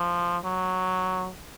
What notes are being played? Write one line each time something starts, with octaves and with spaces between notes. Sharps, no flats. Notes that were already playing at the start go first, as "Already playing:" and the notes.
Already playing: F3
F#3